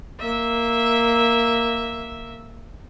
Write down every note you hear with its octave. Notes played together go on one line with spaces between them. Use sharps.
A#3 E5